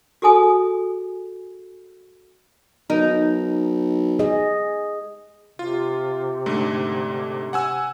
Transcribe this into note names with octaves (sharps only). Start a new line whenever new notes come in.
F#4 G#4 A4 G#5 D#6
B1 D#4 A#4
G#4 D#5
C3 F4
G#2 D3 A3
F#5 G#5 E6